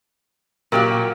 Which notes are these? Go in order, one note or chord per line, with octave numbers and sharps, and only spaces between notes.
A#2 F#3 G4 A#4 F5